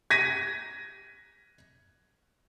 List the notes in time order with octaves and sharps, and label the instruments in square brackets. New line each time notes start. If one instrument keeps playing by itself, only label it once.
[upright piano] G#6 A#6 B6 D#7